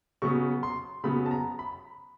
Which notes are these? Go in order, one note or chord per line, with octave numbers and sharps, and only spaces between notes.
C#3 F#3 B3 C#6
C6
C#3 F#3 B3 B5
A5
A#5
B5